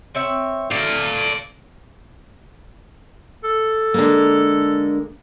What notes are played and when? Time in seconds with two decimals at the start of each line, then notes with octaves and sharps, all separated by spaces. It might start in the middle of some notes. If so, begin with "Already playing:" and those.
0.15 C4 C#5 E5
0.71 A3 D5 F5
3.44 A4
3.94 D3 G#3 A#3